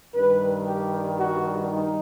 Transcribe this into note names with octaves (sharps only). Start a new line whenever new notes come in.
G2 D#3 G3 B4
G4
F#4
D#4